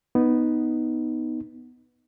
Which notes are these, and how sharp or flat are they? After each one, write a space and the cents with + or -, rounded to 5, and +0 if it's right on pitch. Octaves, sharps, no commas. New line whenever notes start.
B3 +0 D#4 +0